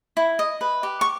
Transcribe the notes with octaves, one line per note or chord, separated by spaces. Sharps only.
E4
D#5
B4
G4
C#6